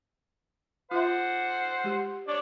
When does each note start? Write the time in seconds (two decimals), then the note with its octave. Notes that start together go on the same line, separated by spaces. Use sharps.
0.91 F4 C5 E5 F#5 C6
1.84 G#3 G4
2.28 D4 C#5 D5